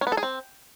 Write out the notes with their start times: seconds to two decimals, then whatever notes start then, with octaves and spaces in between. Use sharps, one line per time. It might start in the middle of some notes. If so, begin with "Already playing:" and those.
0.01 C#4
0.07 B3
0.12 A4
0.17 G#4
0.23 C4